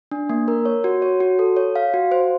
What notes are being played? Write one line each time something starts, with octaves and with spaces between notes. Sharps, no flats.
D4
A#3
A#4
C#5
F#4
C#5
F#4
A4
C#5
F5
F#4
C5